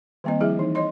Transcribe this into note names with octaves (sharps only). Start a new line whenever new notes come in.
D#3 G3 A#3 C4 D#5
F3 G3 E4 G#4 E5
E3 D#4
C#5 D#5 C6